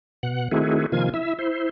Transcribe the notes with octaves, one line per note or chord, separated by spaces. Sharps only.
B2 F#5
D#3 A3 C4 E4 F#4 G#4
C3 D#3 F3 A#3 F4 G#5
E4 E5
E4 C5